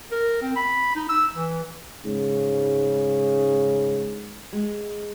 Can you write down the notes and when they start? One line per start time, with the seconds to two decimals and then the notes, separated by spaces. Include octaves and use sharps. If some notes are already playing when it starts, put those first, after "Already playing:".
0.12 A#4
0.42 C4
0.56 B5
0.96 D#4
1.09 E6
1.35 E3
2.05 G#2 C#3
4.53 G#3